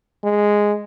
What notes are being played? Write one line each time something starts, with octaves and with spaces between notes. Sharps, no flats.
G#3